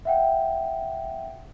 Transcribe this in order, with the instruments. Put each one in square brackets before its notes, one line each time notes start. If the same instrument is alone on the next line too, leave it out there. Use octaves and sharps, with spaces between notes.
[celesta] E5 F#5 G5